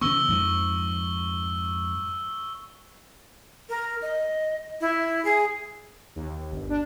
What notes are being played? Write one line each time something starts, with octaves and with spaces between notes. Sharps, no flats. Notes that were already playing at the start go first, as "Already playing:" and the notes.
C#3 E3 B3 C#6 E6 G7
F2 G#2 F3
A#4
D#5
E4
G#4
D#2
G1
D4